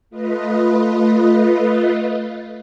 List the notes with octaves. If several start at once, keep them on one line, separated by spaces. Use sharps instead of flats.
A3 F4 B4 D#5